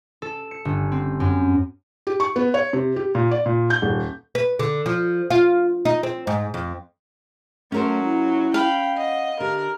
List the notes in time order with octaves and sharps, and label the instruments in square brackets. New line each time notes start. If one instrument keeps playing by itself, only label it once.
[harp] A4
C#7
G1
C4
F#2
[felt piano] G4
C#6
B3
C#5
C3
G4
A#2
D5
A#2
G6
D#1
[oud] B4
D3
F3
F4
D#4
C4
G#2
F2
[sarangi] F#3 [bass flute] A3 [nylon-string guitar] C#4 A#4 C5
[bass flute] E4
[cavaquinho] F5 B5 [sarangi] G5
[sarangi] D#5 [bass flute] F#5
[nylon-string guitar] D3 [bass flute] G4 [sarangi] A#4